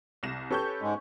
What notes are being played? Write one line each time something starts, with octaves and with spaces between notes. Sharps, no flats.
C2 A#6 E7
C#4 G4 A4 B4 C#6 G6
G#2 G#3